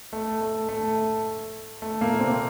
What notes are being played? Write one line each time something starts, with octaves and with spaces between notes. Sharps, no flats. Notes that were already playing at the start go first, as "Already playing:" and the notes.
A3
A3
A3
A3
A#2 A#3
C3 C4